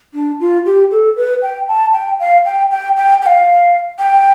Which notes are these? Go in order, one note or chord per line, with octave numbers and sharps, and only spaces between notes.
D4
F4
G4
A4
B4
G5
A5
G5
F5
G5
G5
G5
G5
F5
G5